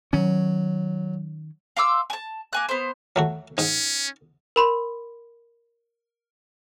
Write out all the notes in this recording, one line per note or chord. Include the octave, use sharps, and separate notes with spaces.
D#3 F#3 C#4
F5 C6 D6 E6
G#5 A5
A#3 G#5 F#6
B3 C5
F#3 A3 F#4
G#2 C#4
A#4 B5 C6